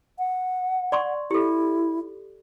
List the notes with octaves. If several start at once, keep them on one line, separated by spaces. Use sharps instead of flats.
F#5
D5 C6 C#6
E4 G4 A4